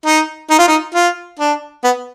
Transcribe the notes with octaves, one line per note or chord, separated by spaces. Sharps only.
D#4
D#4
F4
D#4
F4
D4
B3